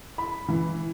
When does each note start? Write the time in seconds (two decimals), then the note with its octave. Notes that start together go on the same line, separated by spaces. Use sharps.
0.18 B5
0.48 E3